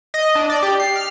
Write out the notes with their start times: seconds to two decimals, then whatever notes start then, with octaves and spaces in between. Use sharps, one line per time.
0.14 D#5
0.35 D4
0.50 D5
0.63 G4
0.80 C7
0.96 F6